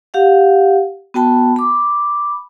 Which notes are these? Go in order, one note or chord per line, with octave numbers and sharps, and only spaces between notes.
G4 F5 F#5
B3 F#4 G5 A5 B5
B5 D6